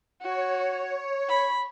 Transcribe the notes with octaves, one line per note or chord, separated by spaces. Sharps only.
F#4 C#5
B5